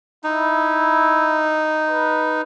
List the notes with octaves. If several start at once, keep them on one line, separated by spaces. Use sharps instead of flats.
D#4 E4
B4